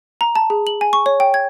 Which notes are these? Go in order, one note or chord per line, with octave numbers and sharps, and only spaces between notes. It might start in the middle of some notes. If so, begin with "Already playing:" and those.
A#5
A5
G#4
F#7
G#5
C#6
C#5
G5
G#6